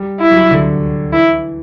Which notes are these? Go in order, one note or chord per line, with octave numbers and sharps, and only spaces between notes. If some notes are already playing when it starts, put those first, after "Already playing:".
Already playing: G3
E4
F#3
D3
E3 E4